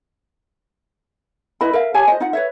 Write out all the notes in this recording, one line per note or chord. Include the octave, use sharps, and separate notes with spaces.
E4 B4 D#5 B5
A#4 E5 F5
G4 C#5 G#5 A5
F4 C5 D#5
D#4 F4 F#5
B4 C#5 E5